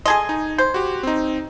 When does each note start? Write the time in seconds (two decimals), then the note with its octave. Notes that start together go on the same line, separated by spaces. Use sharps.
0.06 G#4 A4 D#5 C6 G#6
0.29 D#4
0.58 C5
0.74 F#4 G4
1.03 C4 D#4